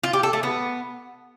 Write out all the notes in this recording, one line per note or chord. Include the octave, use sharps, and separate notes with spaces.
F4
G4
A4
A3
B3